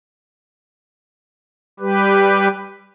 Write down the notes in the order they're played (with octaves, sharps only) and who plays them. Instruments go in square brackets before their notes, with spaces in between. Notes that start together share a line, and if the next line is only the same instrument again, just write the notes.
[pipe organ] G3 G4 B4